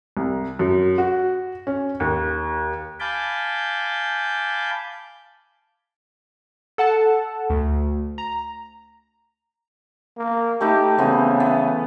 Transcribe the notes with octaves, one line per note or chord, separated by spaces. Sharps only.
C2
F#2
F#4
C#4
D#2
F5 G#5 A5 B5 D6 G6
A4 F#5 A5
D2
A#5
A#3
A3 D#4 G4 B5
C#3 E3 B3 C4
B3